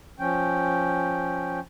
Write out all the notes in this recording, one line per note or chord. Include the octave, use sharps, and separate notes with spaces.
F3 C#4 G5